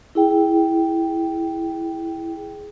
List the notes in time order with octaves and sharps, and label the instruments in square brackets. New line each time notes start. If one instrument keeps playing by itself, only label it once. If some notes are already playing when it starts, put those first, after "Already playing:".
[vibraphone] E4 G#4 G5